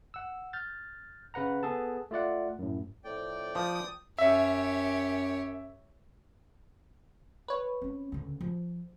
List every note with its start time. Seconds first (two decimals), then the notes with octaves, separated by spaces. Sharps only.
0.14 F#5 E6
0.53 F6 G6 A6
1.34 C#3 B4 F#5 A#5
1.63 B3 G#4 A4 A5
2.11 A3 F4 D5 F#5
2.59 F#2 A2
3.04 F2 A2 D5 G5
3.55 F3 D#6
4.18 F#2 G4 C#5 E5
7.48 B4 C#5
7.82 C4 C#4
8.12 D2 C#3
8.41 F3